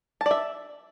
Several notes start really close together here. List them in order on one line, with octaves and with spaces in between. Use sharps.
A5 D5 E5